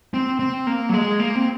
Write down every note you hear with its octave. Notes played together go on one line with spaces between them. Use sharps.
C4
C4
A#3
F#3
G#3
A#3
C4